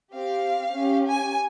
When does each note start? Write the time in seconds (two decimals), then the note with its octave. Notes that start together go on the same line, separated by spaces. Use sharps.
0.14 C4 G4 F5
0.75 C#4 G4
1.05 G#5